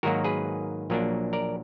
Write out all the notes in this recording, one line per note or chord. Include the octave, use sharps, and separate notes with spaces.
G#2 D#3 F#3 A#3 F#4 A#4
G#4 B4
A#1 A#2 F#3 A#3 D4
A#4 D5